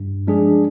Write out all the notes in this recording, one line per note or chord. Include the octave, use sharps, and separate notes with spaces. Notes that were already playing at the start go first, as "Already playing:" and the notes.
Already playing: G2
F3 G#3 D4 G#4